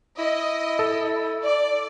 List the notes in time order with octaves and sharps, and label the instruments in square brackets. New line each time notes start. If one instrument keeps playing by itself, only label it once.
[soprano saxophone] E4 [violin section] D#5
[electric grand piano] A4
[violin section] D5